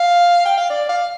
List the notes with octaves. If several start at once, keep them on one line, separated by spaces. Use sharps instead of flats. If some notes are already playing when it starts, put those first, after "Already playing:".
Already playing: F5
G5
F5
D5
F5